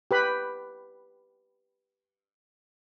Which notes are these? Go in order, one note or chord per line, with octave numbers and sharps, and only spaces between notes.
G4 B4 B5